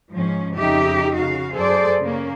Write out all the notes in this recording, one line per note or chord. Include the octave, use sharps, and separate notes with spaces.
G#2 F3 C#4
F2 C#3 D#4 G4 E5
C#3 F#4 F5
F#2 G#4 A4 C5 D5
C#3 A#3 C#4